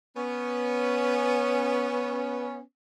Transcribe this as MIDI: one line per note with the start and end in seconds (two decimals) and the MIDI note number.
0.16 2.59 59
0.16 2.59 61